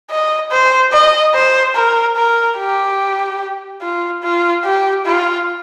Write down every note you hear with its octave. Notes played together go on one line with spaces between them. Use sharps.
D#5
C5
D#5
C5
A#4
A#4
G4
F4
F4
G4
F4